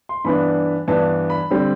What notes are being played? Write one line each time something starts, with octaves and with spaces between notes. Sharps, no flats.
C6
G2 E3 B3 D4 B5
G2 E3 B3 D4 A5
B5
D3 G3 C4